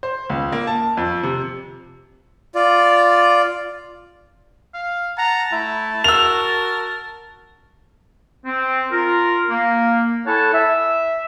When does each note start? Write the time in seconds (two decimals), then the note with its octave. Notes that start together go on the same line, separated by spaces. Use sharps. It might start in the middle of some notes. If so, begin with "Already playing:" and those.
0.03 C5
0.30 C#2
0.52 A#3
0.67 A5
0.97 F2
1.23 C3
2.55 F4 D5
4.74 F5
5.18 F#5 A5 A#5
5.52 A3 E4
6.04 F#4 A#4 E6 F7
8.45 C4
8.91 F4 A#4
9.49 A#3
10.26 E4 A4 C#5 F#5 G#5 A5
10.53 E5